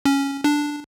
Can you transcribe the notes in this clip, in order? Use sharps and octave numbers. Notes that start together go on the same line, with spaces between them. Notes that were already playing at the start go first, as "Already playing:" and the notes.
C#4
D4